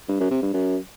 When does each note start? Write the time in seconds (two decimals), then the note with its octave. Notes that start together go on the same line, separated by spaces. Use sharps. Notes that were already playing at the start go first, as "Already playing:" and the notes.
0.09 G2
0.20 F#2
0.31 C3
0.42 G2
0.53 F#2